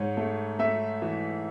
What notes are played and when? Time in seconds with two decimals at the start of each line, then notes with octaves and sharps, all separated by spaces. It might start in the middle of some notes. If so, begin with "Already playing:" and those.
Already playing: G#2 C#5
0.17 A3
0.59 A3 E5
1.02 E3